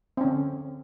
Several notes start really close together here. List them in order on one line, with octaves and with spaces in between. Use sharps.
C4 C#4 D3